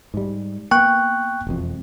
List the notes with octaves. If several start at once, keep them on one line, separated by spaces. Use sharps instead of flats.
G#2 G3
A#3 B3 G5 C#6 F#6
E1 F2